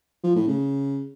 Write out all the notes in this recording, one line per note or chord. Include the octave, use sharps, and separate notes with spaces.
F3
A2
C#3